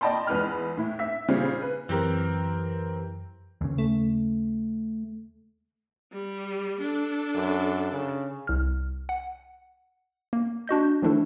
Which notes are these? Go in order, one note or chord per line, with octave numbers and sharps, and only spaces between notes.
D5 D#5 G5 A5 B5 C6
E2 G#3 B4 B5 F6
A2 E4
E5 B6
A#2 C#3 G3 C4
B4
F#2 E3 C4 G4 A#4
D#2 C#3
A3
G3
D4 A4
F#2
C#3
C2 F6
F#5
A#3
D4 F#4 D#5 G6
D#3 F3 A3 D4 E4 A4